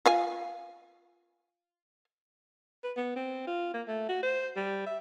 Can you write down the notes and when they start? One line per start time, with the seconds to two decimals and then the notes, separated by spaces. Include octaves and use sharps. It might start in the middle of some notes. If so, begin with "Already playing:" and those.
0.06 F4 F5 G#5
2.83 B4
2.96 B3
3.16 C4
3.47 F4
3.73 A#3
3.87 A3
4.09 F#4
4.23 C5
4.56 G3
4.86 E5